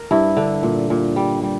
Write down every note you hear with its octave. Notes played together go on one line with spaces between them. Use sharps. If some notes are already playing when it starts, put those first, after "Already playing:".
Already playing: A#4
G2 E4
D3
A#2
A#2
G3
G3